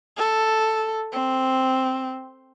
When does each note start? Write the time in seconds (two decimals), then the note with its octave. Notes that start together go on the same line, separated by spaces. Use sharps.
0.17 A4
1.13 C4